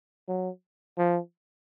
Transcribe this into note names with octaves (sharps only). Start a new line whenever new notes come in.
F#3
F3